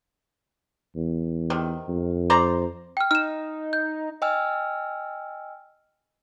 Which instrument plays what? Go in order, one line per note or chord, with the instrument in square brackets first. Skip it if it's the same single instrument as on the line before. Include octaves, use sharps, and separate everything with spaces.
[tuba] E2
[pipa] C3 D#3
[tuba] F2
[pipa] C5 D5 A#5
[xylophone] G5 F6
[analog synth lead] D#4 [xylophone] F6 E7
[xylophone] G6
[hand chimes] D#5 G5 G#5 E6 F6